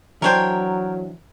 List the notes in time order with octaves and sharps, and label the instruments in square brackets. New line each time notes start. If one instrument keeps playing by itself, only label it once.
[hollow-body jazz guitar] E3 D4 C5 [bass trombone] F#3 [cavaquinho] A#4 C#5 G5